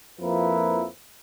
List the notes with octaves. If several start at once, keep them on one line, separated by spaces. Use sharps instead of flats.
F2 F3 A#3 E4 A#4 B4